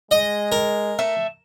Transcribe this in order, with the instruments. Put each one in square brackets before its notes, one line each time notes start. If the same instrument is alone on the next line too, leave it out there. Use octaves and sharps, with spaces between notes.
[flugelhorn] G#3 [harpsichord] D#5
[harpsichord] A#4
[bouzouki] A3 E5